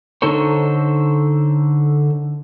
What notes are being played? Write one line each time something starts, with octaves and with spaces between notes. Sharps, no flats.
D3 D#4 A4 C5 C#5